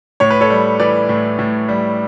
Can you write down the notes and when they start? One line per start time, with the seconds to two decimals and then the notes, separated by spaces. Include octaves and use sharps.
0.20 A2 C#5
0.30 B4
0.41 A4 C#5
0.50 G3
0.79 E3 B4 D5
1.09 A2
1.39 A2
1.69 G3